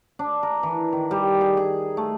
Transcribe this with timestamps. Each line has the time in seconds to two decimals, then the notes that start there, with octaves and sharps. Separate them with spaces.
0.19 D4
0.43 A#4
0.63 E3
0.93 D#3
1.11 G3
1.41 G#4
1.57 G#4
1.97 A3